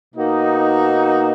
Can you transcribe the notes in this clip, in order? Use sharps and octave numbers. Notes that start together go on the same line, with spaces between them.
B2 A#3 D#4 F#4